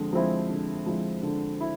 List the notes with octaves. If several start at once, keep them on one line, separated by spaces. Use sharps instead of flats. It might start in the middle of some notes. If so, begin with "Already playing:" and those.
Already playing: D3 F3 G#3 C4
F3 G#3 C4 E4
D3
F3 G#3 C4 E4
D3
E4